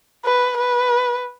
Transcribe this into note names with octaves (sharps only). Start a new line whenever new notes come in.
B4
B4